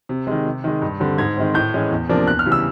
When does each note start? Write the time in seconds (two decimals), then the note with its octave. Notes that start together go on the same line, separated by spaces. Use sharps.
0.09 C3
0.27 D#3 G#3
0.46 C3
0.64 D#3 G#3
0.82 G2
1.00 D3 G3 C4
1.18 G#2 G#6
1.37 D#3 G#3 C4
1.54 A2 G6
1.73 E3 G#3 C#4
1.91 E2
2.09 C3 F3 A#3 D4
2.27 E2 F#6
2.39 F6
2.46 C#3 E3 G3
2.52 E6